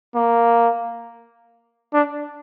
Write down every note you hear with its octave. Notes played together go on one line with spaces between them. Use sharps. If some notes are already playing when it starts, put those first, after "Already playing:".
A#3
D4